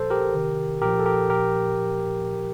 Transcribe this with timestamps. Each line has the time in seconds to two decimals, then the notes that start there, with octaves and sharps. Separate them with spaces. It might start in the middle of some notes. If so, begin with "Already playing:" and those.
Already playing: A#2 F3 A4 C5
0.10 G4 A#4
0.34 C3 D#3
0.82 A#2 F3 G4 A#4
1.00 A4
1.06 G4 A#4
1.30 A#2 F3 G4 A#4